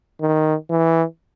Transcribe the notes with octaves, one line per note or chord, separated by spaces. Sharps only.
D#3
E3